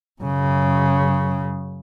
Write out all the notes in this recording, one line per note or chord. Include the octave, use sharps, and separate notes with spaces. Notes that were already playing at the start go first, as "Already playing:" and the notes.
F#2 C#3